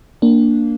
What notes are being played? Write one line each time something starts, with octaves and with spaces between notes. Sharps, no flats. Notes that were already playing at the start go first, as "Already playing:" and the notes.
A#3 D4